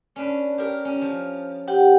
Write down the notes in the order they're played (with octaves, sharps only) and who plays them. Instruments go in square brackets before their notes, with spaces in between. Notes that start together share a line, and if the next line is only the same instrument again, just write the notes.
[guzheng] C#4 D4 B4
G4 A#4
C#4
F3
[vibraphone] G4 F#5 G5